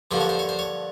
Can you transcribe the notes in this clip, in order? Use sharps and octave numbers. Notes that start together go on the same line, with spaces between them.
G2 D3 F3 A#3 C5
C#5
C5
C#5
C5
C#5